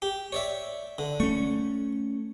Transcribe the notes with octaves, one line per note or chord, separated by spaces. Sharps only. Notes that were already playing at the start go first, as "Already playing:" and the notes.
G4
C#5 D5 E5
D3
A3 C#4 C#6